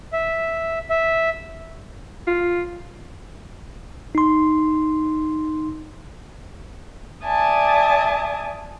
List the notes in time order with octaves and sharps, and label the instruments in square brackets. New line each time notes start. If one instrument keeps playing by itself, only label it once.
[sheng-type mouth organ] E5
E5
[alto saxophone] F4
[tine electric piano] D#4 C6
[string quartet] D5 E5 G#5 A5 D#6